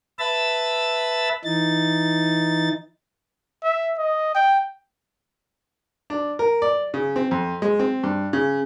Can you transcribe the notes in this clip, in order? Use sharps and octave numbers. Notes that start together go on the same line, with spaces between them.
B4 E5 A5 B5 E6 A6
E3 D#4 A6
E5
D#5
G5
D4
A#4
D5
C#3
C4
F2
G#3
C4
G2
C#3